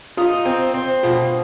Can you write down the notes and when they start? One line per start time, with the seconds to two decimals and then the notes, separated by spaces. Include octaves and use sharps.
0.17 D#4 F4
0.45 C4
0.74 C4
1.03 B2 F4